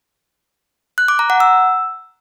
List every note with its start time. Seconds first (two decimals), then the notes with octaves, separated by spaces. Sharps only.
0.98 F#6
1.08 D6
1.19 A#5
1.30 F#5
1.40 E6